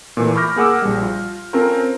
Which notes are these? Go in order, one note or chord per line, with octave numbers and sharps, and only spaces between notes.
A#2 E3 A3
B5 C#6 D6 F6 G6 A#6
A#3 G#4 F#5 D6 E6
A#1 G3
F4
C4 C#4 F4 A4 A#4 C5